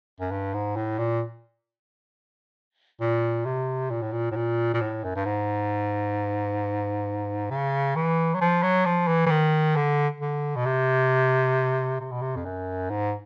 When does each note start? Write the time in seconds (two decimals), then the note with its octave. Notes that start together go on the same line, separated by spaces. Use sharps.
0.20 F#2
0.31 G2
0.54 G#2
0.76 A2
0.98 A#2
3.01 A#2
3.45 C3
3.90 A#2
4.02 A2
4.12 A#2
4.31 A2
4.36 A#2
4.74 A#2
4.81 A2
5.04 F#2
5.15 G2
5.25 G#2
7.50 C#3
7.96 E3
8.34 F#3
8.41 F3
8.62 F#3
8.85 F3
9.07 E3
9.26 E3
9.30 D#3
9.76 D3
10.20 D3
10.56 B2
10.66 C3
12.00 C3
12.11 B2
12.21 C3
12.36 F2
12.45 F#2
12.90 G#2